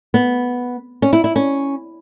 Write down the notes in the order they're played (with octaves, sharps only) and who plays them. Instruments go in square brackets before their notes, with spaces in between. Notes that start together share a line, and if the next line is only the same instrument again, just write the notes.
[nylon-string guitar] B3
C#4
E4
E4
C#4